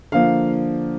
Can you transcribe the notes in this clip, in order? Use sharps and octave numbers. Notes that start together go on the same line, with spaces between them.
D3 F3 A#3 F5